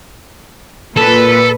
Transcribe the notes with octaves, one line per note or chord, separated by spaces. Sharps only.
A#2 A4 B4